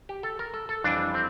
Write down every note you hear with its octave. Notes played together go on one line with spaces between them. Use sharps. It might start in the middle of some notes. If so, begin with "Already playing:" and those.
G4
A4
A#4
A4
A4
F2 E3 G3 D4
C4